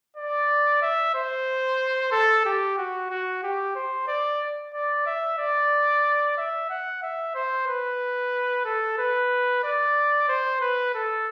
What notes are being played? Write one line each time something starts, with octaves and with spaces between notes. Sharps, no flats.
D5
E5
C5
A4
G4
F#4
F#4
G4
C5
D5
D5
E5
D5
E5
F#5
E5
C5
B4
A4
B4
D5
C5
B4
A4